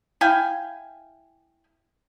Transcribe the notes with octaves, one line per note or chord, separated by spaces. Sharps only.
E4 F5 G5 G#5